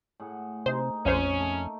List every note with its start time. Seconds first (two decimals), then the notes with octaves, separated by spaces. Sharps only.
0.20 A2 G#4 F#5
0.66 C3 A#3 D#4 C5
1.05 A#1 F2 C#4 C5
1.40 A3 A#3 A5